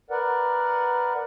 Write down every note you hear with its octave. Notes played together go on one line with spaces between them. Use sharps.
A#4 B4 D5 F#5